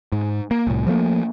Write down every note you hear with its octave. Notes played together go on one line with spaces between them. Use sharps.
G#2
A#3
C2 A2
F3 G3 A3 A#3